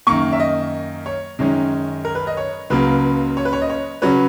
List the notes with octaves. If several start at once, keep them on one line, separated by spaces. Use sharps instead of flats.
F#2 D#3 A#3 C#6
E5
D#5
C#5
F#2 D#3 G#3 C#4
A#4
B4
D#5
C#5
C#2 C#3 F#3 A#3 B4
C#5
B4
C#5
D#5
C#5
C#3 F#3 C#4 B4